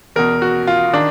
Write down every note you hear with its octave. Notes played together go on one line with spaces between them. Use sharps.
E2 B2 A#4
F#4
F4
D#3 D4